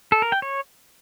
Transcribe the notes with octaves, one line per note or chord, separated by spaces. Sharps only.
A4
A#4
G5
C#5